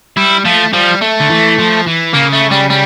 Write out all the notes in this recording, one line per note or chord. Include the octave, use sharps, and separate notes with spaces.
G3 E4
F3 A3
F3 G3
A3
D3
E3
F3
E3
C#3 A#3
A3
G3
G3